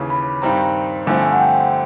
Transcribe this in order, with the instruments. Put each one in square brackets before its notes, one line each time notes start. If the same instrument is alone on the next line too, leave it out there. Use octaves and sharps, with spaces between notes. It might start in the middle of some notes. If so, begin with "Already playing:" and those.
Already playing: [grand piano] D#2 C#3 E3
[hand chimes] B5
[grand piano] G2 D#3 G3 C4 [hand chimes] A#5
[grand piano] G2 D3 F3 A3 C4 [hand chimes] G#5
[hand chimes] G#5
F#5
G5